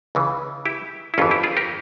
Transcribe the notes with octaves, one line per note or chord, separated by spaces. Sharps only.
C#2 C#3 E3
E4 G4
E4
G1 F2 E3 C#4 F4
E4 G4
F4 G#4
G4 A#4